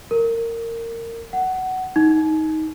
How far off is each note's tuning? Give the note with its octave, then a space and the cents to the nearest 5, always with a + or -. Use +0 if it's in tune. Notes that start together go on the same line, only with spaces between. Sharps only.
A#4 -20
F#5 +15
D#4 +15